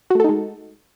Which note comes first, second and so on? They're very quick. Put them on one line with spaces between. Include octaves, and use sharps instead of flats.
F#4 A3 A4 D#4 G#3